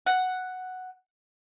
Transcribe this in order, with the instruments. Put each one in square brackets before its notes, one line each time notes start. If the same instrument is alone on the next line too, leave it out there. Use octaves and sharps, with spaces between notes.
[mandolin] F#5